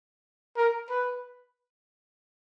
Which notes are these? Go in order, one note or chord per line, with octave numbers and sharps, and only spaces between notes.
A#4
B4